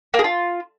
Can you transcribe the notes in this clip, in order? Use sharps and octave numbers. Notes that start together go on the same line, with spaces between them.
A#3
G#4
F4